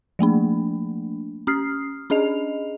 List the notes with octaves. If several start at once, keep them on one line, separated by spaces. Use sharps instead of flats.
F3 A3 A#3 D4
C#4 D#6 F6 C7
C#4 D4 G#4 D#5 F7